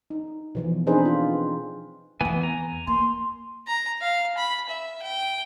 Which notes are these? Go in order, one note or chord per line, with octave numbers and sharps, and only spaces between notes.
D#4
B2 E3 F3
C4 D4 D#4 G#4 B4 C5
F4
E2 E3 B3 C4 G#5
G#5 A#5
A#3 C6
A#5
F5
B5
E5
G5